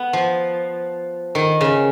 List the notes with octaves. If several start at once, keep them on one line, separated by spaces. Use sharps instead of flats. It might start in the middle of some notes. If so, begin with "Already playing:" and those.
Already playing: B3
F3
D#3
C#3